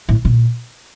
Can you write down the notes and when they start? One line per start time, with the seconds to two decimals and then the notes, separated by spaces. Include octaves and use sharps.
0.09 A2
0.25 A#2